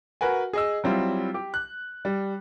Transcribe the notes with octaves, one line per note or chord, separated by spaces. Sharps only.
F#4 A#4 B4 F#5 G#5
G#4 D#5 E6
F#3 G3 C4 E4 F4
G4
F#6
G3